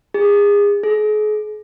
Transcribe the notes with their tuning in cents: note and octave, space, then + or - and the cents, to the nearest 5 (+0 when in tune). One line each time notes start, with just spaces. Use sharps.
G#4 -30
G#4 +40